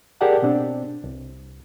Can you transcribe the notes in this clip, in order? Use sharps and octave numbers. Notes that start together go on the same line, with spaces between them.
G4 G#4 A#4 D5 F#5 A5
B2 C4 D4
C2